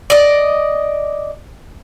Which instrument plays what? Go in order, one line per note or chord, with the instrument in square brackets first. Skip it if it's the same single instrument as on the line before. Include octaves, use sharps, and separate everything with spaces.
[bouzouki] D5 D#5